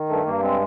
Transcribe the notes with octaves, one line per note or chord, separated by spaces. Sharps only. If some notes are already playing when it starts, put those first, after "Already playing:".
Already playing: D#3
G2 A3
G2 A#3
G#3 C4